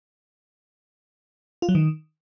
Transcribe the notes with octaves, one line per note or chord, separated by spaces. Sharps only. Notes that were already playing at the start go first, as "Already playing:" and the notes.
F4
F#3
D#3